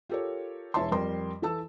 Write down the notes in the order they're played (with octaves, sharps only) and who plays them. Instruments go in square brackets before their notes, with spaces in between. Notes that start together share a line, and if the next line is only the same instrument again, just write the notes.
[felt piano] F4 G4 A4 A#4 C#5
E1 E3 C#5 E5 A5 C6
F2 G3 A#4 C6
E3 A4 A5 E6